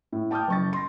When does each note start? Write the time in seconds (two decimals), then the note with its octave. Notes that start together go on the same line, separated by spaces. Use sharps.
0.13 A2
0.31 G5 A5 D6 D#6 F6 G6
0.48 F#1 C#6 A6
0.73 C6 A#6